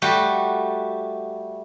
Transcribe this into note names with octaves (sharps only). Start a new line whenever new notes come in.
G3 A3 F#4 G4